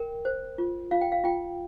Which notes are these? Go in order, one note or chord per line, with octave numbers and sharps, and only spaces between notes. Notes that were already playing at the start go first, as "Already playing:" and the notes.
Already playing: A#4 G5
C5
F4
F4 F5
G5
F5
F4 G5